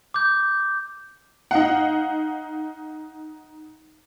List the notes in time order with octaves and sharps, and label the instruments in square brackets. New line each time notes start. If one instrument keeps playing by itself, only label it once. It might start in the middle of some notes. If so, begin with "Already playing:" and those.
[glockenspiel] D6 G6
[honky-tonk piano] D#4 F5 F#5